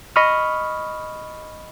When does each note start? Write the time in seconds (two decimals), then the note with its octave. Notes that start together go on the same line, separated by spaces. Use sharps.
0.16 D#5 B5 C#6 D#6 F6